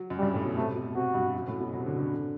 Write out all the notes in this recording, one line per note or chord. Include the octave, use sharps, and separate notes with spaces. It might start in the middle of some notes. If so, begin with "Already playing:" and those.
Already playing: F#3
F#2
G2 G3
A2
B2
C3 A3
B2
C3 F#4
G2
F#2
A2
B2
F#3
C3
D3
D3